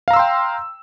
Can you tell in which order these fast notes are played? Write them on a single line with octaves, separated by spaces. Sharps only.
F5 A#5 E6 C6 G5